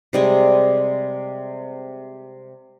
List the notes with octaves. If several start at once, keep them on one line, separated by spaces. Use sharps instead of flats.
C3 G3 G#3